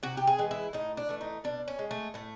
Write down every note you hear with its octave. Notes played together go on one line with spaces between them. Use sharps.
C3 F#4
G4
G#4
E3 G#3
E4
A2 D#4
D4
E3 A3
D#4
B2 D4
C#4
G#3
A3
A2 A3